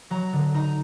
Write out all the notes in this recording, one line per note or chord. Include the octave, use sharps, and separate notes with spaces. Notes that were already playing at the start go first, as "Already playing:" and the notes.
F#3 A#5
D3
D#4 A#5